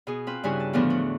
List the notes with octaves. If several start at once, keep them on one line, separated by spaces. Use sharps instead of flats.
B2 G#4
C4 F4 B4
G2 C#3 E4 F#4 G#5
A5
E2 A2 D3 F3 B3 D4
F#4